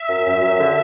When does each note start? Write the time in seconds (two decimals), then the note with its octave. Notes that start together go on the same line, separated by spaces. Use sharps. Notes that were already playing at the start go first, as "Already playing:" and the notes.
Already playing: E5
0.09 F#2
0.26 F#2
0.41 F#2
0.59 D3